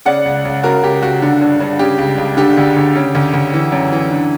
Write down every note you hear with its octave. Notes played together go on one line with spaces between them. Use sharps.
C#3 D5 F#5
C#2
C#2
C#3 F#4 A#4
C#2 G4
C#2 F#4
D3
G2
G2
C#3 G4
C#2
C#2
D3 G4
D2
D2
C#3
D2
D2
E3
F#2
E3
D3